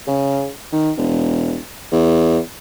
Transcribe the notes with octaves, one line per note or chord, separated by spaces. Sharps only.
C#3
D#3
E1
E2